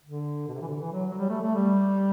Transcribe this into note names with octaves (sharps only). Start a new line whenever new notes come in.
D3
B2
C3
E3
D3
E3
F#3
F#3
G3
A3
A3
G3